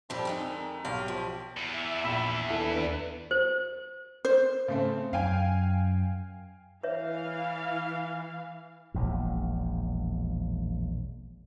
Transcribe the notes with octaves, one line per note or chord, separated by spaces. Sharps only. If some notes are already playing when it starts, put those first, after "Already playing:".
F2 F3 G3 C4
D3 G#3 D#4
A#4
B1 G4 F5
F3
E2 E5
A#1 B5
D#2 D4 E4 A4 B4
C5
C5
C#3 A3 C4
F#2 F5 G5 G#5
E3 B4 C#5 E5 F5
E1 A#1 E2